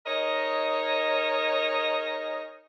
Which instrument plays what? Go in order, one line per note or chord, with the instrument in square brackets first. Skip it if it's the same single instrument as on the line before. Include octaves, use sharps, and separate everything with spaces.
[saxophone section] D#4 G#4 A#4 C#5 D#5